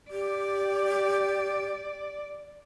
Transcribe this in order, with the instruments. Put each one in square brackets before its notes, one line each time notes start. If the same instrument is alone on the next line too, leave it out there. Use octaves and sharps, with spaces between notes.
[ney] G4 [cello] D5